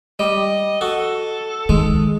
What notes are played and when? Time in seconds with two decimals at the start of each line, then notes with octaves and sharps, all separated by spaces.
0.19 G3 D#5
0.81 F#4 A4
1.69 D#3 G#3